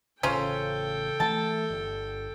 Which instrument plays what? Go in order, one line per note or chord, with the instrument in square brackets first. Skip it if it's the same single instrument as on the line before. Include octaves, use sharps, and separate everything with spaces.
[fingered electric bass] A1 C#3 [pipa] C#4 F4 C5 [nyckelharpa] A4 G5
[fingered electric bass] E3 F3 A3 [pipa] A5
[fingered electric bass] G1